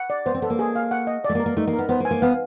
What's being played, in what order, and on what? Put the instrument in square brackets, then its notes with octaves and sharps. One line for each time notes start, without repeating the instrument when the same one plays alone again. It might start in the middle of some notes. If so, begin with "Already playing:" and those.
Already playing: [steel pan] F#5
D5
[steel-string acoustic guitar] B3 [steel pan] C5
[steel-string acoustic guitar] C4
[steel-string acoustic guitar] B3 [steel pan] A4
[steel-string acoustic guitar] A#3
[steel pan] G#4
F5
F#5
D#5
[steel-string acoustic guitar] A3 [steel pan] D5
[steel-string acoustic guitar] A#3
[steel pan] A#4
[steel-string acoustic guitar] A#3
[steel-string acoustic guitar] A3 [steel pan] D#4
[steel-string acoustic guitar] A#3
[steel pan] A#4
[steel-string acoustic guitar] B3
[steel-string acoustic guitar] B3 [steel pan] C5
[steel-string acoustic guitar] A#3
[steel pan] G#5
[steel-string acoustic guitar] A#3
[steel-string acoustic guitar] B3 [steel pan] F5